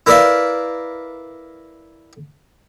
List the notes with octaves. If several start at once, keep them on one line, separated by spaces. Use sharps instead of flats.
E4 A#4 B4 D5 E5 F5